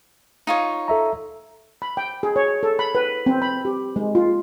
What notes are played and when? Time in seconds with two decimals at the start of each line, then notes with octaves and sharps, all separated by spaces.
0.47 D#4 F4 C#5
0.88 A4 E5 A#5
1.82 B5
1.97 G5
2.23 G#4
2.36 C#5
2.63 A4
2.79 B5
2.95 B4
3.26 C4
3.42 B5
3.65 G4
3.96 G#3
4.15 F4